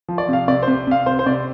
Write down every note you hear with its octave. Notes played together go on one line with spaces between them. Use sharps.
F3
D5
C3 F5
C3 D5
C3 C5
C3 F5
C3 C5
C5
C3 D5